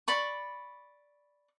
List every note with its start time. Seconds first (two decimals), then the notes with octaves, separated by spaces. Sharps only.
0.08 D5 B5 C#6